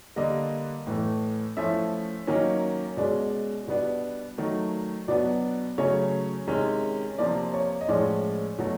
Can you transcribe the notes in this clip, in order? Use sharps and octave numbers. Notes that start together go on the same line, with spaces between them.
D3 G3 A#3 D4 D#5
A2 E3 A3
F3 A3 C#4 E4 E5
D#3 F#3 A#3 C#4
B2 G#3 C#4 D5
B2 G3 B3 D4
D#3 F#3 A3
B2 F#3 B3 D4 D5
C#3 F#3 A3 C#4 C#5
C3 D#3 G#3 C#4
C3 F3 A#3 D5
C#5
D#5
A2 F3 G#3 C#4 D5
B2 F#3 A3